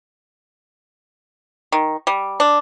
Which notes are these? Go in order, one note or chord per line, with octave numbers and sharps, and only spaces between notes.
D#3
G3
D4